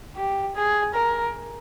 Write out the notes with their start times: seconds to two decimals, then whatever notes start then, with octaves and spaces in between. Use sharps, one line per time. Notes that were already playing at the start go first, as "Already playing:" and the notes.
0.16 G4
0.55 G#4
0.94 A#4